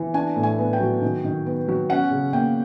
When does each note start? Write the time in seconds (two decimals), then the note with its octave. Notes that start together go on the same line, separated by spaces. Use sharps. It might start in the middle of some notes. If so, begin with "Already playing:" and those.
Already playing: E3
0.14 D4 G#5
0.36 A2
0.43 G#5
0.58 B3
0.73 G5
0.80 F#3
1.02 D#3
1.24 D#3
1.46 B3
1.68 F#3
1.90 C#4 F#5
2.11 C#3
2.33 A#3 G5